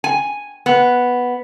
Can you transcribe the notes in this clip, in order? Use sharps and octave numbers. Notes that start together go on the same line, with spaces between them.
G#5
B3